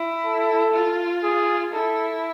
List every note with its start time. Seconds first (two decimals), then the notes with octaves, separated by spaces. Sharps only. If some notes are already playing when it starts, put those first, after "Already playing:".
Already playing: E4
0.25 A4
0.74 F4
1.24 G#4
1.73 E4 A4